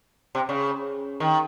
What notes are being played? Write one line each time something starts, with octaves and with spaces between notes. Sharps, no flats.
C3
C#3
D#3